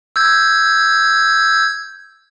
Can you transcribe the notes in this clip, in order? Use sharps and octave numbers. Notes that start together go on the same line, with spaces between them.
E6 G6 G#6